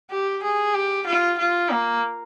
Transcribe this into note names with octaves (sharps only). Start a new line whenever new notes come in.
G4
G#4
G4
F4
F4
A#3